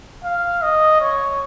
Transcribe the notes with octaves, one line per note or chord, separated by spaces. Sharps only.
F5
D#5
C#5